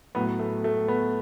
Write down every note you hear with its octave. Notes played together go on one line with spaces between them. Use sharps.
A2 F#3 B3
A3
A3
B3